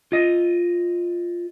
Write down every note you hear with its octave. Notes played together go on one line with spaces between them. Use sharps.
F4 D#5